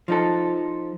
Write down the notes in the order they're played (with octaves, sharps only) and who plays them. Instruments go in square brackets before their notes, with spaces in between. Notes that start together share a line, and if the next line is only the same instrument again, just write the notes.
[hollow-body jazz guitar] F3 D#4 A4